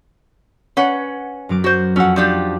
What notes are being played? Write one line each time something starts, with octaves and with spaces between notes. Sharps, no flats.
C#4 B4 F#5
F#2 F#3 D6
F#4 C5
F2 C#4 F#4 F#5 E6
F3 D4 G4 C#6